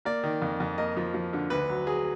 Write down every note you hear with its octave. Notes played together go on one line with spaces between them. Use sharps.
A#3 D5
D#3
F2
F2
A#3 D#5
F3
F3
D3
D2 B4
F#3
F#3 G#4